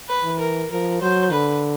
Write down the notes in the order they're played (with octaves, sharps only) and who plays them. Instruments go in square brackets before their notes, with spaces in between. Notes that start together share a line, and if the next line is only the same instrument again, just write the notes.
[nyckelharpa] B4
[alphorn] E3
[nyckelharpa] A#4
[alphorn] F3 [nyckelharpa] A#4
[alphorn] F#3 [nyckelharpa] C5
[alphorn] D3 [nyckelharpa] B4